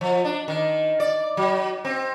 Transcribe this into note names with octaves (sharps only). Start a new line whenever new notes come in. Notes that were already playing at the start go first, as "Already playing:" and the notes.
F3
D4
D#3
D5
F#3
C4